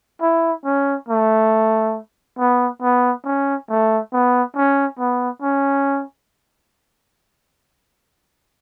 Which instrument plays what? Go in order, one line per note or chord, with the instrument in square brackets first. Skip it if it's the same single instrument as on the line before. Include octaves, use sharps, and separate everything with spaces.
[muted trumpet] E4
C#4
A3
B3
B3
C#4
A3
B3
C#4
B3
C#4